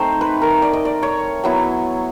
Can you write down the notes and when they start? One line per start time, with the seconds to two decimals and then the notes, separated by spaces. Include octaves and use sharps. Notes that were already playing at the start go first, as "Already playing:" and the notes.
Already playing: A3 C4 D#4 C5
0.21 B4
0.42 A#4
0.62 D5
0.73 D#5
0.85 D5
1.03 C#5
1.44 F#3 B3 E4